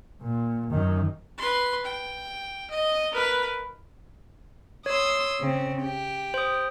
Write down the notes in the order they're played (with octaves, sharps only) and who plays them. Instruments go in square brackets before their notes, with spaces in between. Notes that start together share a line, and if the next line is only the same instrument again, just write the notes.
[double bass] A#2
F#2 D#3
[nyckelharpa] B4 C6
G5
D#5
A#4 B4
[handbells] C#5 [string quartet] C6 D#6 E6
[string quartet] C#3 C4
G4
[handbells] C5 D#6